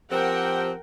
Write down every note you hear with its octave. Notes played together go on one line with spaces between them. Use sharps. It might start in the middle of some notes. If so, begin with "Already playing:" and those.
F3 C4 G4 A#4 F#5 G5